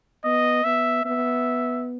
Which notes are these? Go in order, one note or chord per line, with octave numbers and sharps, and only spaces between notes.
B3 D#5
B3 E5
B3 E5